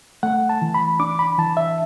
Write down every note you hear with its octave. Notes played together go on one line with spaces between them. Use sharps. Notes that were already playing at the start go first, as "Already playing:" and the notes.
A3 F#5
A5
E3
B5
D4 D6
B5
E3 A5
E5